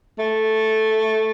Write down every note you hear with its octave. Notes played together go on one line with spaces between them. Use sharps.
A3